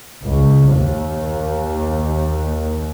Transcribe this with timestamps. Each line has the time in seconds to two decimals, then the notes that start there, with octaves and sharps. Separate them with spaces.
0.23 C#2
0.72 D#2